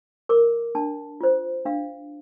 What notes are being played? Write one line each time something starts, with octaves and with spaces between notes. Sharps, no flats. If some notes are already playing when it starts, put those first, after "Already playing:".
A#4 D6
D4 A5
F4 C5
D4 F5